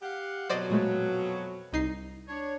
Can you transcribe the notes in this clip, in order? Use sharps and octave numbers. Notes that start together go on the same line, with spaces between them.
G4 F5 F#5
F2 B2 F#3 C5 D5 D#5
A#2 G#3 A3
C2 D#4 C7
D4 C#5